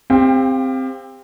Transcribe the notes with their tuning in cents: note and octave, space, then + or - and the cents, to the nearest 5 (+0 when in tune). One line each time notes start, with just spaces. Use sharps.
C4 +0 G4 +30 F5 +0